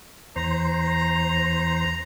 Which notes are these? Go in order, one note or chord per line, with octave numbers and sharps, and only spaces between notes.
E2 C5 A#5